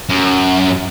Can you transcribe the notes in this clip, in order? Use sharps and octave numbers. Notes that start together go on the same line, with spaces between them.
F#2